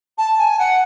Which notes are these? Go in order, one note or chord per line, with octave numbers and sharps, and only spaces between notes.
A5
G#5
F#5